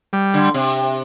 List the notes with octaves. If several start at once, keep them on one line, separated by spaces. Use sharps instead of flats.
G3
D3
C3